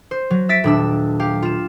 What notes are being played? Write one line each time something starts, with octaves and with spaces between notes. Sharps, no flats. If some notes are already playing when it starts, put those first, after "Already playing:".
C5
F#3
E5 A6 B6 D7
D#1 D4 E6
G4 F5
F4 E7